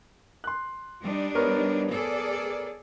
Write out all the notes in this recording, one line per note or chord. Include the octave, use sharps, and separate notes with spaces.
C6 F#6
G3 D4 D#4
B3 A#4 C#5
G#4 A4 D5